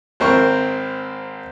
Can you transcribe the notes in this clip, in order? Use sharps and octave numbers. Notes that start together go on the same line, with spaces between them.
G#1 C4 A#4 C#6